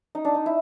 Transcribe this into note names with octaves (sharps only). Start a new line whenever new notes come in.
D#4
D4
D#4
E4